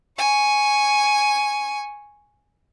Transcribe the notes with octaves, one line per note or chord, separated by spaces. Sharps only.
G#5 C#6